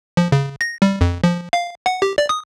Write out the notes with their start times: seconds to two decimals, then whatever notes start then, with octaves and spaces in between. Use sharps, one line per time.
0.17 F3
0.32 C#3
0.61 A#6
0.82 G3
1.01 F2
1.24 F3
1.53 F5
1.86 F#5
2.02 G4
2.18 D5
2.29 D#6